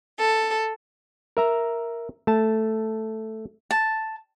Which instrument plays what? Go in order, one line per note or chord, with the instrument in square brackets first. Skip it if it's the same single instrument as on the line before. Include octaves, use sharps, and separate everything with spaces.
[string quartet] A4
[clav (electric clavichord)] A#4 E5 A#5
A3 A5
[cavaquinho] A5